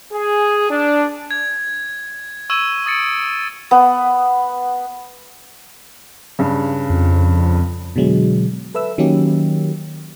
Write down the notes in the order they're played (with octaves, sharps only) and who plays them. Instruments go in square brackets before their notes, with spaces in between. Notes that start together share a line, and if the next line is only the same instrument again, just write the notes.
[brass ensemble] G#4
D4
[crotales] G#6
C#6 E6 G#6 D#7 E7 G7
D#6 A6 C#7 D7
[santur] B3
[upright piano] G2 C#3
[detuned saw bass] F2
[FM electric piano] B2 D3 F#3 G#3
A4 B4 E5 E6
D#3 F#3 A#3 C#4 D#4 G4